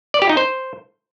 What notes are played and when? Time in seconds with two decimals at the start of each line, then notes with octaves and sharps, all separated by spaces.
0.14 D5
0.22 G4
0.29 D#4
0.37 C5